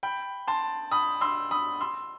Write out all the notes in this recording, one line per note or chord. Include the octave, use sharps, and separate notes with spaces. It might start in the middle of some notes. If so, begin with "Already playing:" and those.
G5 B5
A5 C6
B5 D#6
C6 E6
B5 D#6
C6 E6